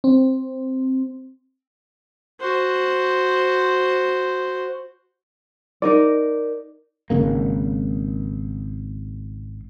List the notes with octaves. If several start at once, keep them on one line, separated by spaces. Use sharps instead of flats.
C4
F#4 C5
D#4 A#4 D5
G#1 C#3 A#3